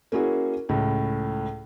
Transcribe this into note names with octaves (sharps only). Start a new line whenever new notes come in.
A#3 C#4 E4 F#4 G#4
C#2 A2